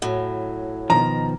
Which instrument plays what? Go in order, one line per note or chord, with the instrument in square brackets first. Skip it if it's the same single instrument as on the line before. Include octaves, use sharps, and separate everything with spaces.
[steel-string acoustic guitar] A2 F#3
[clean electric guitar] B2 D#3 F3 [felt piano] A#5